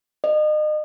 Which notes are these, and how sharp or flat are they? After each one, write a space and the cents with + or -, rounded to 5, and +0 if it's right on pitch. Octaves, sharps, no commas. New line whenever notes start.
D#5 -35